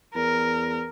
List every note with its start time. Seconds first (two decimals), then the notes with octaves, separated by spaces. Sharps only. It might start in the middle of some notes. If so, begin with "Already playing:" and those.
0.15 E2 A#4